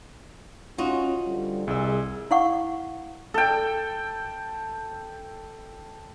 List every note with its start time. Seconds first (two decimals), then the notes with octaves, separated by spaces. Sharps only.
0.78 C#4 D#4 F4 F#4
1.26 D3 F3 G3
1.67 C2 G#4 D#5 E6
2.31 E4 F5 F#5 C#6
3.34 A4 G5